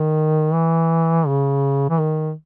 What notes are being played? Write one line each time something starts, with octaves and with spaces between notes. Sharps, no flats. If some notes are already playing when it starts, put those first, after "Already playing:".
Already playing: D#3
E3
C#3
E3
D#3